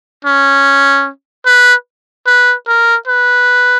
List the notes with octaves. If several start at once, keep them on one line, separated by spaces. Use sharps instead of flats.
C#4
B4
B4
A#4
B4